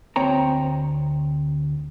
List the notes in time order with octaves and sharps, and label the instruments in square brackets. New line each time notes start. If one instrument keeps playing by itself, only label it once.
[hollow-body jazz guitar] D2 C4 C#5 G5 A#5